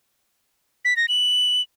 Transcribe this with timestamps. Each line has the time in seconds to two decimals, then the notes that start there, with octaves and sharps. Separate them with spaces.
0.85 B6
0.97 A#6
1.08 F#7